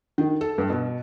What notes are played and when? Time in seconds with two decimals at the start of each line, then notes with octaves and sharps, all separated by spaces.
0.18 D#3
0.41 A4
0.58 G2
0.70 B2